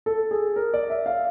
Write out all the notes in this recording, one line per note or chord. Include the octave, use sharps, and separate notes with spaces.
A4
G#4
A#4
D5
E5
F5